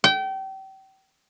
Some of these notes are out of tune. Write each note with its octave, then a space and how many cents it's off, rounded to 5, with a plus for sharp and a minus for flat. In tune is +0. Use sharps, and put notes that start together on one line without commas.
G5 -30